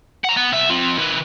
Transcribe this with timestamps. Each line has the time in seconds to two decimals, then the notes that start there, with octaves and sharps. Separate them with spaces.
0.25 F#5 A#5
0.37 B3
0.52 C2 E5
0.70 C4 F4
0.98 D#3 B4